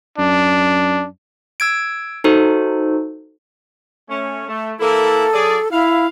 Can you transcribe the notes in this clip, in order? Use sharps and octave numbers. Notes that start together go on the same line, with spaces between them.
F#2 D4
E6 G#6 D7
D#4 F#4 A4 C5
A3 C#4
A3
E3 A#3 E4 A4
F#3 G#4 D5
E4 F5